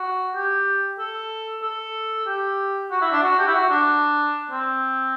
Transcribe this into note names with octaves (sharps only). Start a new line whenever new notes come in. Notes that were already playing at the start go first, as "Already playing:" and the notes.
Already playing: F#4
G4
A4
A4
G4
F#4
E4
D4
F#4
G4
E4
F#4
D4
C4